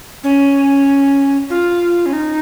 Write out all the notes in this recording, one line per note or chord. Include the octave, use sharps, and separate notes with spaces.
C#4
F4
C#4
D#4